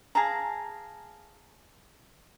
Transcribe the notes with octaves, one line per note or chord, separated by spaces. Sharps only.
G#4 F5 A5 A#5